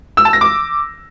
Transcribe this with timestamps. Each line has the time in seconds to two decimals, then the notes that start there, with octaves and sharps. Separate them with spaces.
0.17 E6
0.25 A5
0.33 A#6
0.41 D6